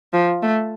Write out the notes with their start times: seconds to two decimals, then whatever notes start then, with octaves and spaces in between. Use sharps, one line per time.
0.13 F3
0.42 A3